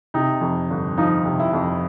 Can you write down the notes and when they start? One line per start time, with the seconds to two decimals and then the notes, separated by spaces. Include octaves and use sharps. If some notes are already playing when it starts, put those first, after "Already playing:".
0.14 C3 D#4
0.41 F2
0.70 G1
0.97 F3 D#4
1.25 C3
1.40 E4
1.53 F2